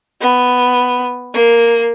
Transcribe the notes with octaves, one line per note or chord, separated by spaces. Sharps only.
B3
A#3